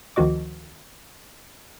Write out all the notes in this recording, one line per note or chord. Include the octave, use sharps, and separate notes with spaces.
D2 D#3 F3 F#4 D#5 D6